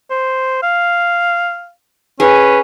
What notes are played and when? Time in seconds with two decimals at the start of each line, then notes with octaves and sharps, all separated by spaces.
0.10 C5
0.62 F5
2.20 C#4 G#4 B4